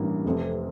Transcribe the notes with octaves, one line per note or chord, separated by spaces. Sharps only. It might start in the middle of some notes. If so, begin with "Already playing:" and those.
Already playing: A1 G2 E3 A#3
F1 F2 C3